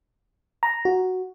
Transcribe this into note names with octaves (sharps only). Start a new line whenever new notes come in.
A#5
F#4